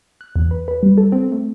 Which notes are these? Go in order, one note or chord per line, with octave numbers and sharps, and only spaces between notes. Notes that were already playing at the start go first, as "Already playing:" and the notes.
F#6
E2
B4
B4
G3
A4
C4
A3